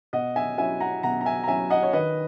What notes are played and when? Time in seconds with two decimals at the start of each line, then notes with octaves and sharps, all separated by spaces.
0.13 B2 D#5 F#5
0.36 E5 G#5
0.58 F#3 C#4 E4 E5 G#5
0.80 F#5 A#5
1.03 B2 F#5 A#5
1.21 A#5
1.26 E5 G#5
1.43 A#5
1.48 F#3 C#4 E4 E5 G#5
1.70 D#5 F#5
1.83 C#5
1.93 D#3 B4 D#5